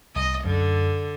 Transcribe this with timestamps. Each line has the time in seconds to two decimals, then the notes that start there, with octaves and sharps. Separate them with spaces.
0.15 C2 D#5
0.45 F#2 D3